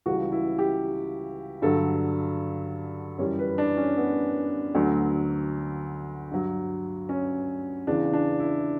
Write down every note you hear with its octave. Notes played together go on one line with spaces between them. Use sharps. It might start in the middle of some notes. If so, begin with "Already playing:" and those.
C#2 C#3 E3 G3 F#4
E4
G4
G2 D3 F#3 A4
F#2 E3 G3 C#5
B4
D4
C#4
B3
D2 D3 F#3
G2 F#3
C#4
E2 C#3 E3 D4
D4
E4